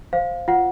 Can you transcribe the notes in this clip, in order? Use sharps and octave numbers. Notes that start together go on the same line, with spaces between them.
C5 F5
F4 F#5